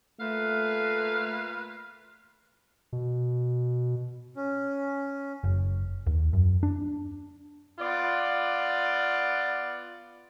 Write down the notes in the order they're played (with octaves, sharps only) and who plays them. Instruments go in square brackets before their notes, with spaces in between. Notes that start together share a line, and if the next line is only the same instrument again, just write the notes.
[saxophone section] A#2 B4 F5 [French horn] A3
[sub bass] B2
[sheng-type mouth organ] C#4
[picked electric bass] F#1
D#2
F#2
D4
[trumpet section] B3 F4 D5